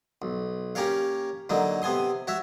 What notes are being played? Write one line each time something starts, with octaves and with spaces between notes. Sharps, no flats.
B1
A#3 C#4 G4 A#4 C#5 F5
D3 F#3 A#3 D#4
C3 B3 G#5 C6 D#6
F#4 C#5 E5